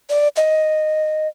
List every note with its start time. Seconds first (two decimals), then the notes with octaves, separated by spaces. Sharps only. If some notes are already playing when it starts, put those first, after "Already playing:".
0.10 D5
0.36 D#5